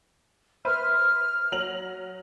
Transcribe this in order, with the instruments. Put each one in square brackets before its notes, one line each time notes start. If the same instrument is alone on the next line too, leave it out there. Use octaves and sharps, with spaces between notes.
[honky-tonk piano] B4 C5 E5 [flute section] F6
[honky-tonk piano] F#3 F7 F#7